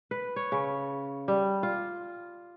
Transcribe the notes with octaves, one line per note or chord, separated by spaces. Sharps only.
B4
C#5
C#3
G3
F4